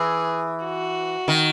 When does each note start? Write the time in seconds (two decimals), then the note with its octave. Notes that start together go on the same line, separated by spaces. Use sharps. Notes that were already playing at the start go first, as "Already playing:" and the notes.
Already playing: E3 G#4
0.65 F#4
1.28 D#3